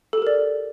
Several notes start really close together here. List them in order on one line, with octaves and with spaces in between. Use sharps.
A4 G4 A#4 D5